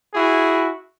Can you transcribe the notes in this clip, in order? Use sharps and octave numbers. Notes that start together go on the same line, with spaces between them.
E4 F#4 G#4